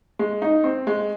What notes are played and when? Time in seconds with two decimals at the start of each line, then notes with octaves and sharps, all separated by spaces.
0.19 G#3
0.42 D#4
0.64 C4
0.87 G#3